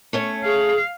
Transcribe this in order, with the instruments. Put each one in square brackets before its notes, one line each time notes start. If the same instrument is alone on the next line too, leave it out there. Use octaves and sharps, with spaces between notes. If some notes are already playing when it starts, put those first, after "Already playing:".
[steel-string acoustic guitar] A3 C#4 C#5
[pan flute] G#4 [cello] F5